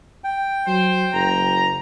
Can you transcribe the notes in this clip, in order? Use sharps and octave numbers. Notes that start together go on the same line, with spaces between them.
G5
F#3 C5
F#1 A#5